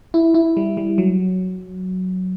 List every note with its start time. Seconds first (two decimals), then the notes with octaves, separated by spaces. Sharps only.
0.14 E4
0.34 E4
0.57 G3
0.77 G3
0.98 F#3